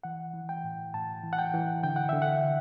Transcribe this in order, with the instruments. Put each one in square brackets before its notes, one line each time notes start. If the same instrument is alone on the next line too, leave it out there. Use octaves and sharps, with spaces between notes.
[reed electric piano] E3 F#5
E3
G5
A2
A2 A5
E3
F#5
G5
E3
D3 G5
F#5
D3 E5
F#5